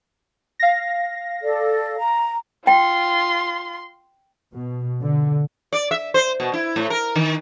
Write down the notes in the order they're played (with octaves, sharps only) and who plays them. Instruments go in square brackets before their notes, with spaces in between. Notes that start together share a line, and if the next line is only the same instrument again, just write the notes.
[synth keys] F5 A#6
[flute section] A4 D5
A#5
[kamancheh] F4 C6 [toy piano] G5
[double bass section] B2
D3
[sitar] D5
E5
C5
B2
E4
A2
A#4
D#3